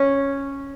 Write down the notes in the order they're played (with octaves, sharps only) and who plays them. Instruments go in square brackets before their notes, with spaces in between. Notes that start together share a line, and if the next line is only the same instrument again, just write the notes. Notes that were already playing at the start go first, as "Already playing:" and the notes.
Already playing: [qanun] C#4